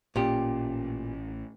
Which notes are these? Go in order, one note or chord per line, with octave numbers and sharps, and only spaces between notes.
A1 A#2 C#4 G4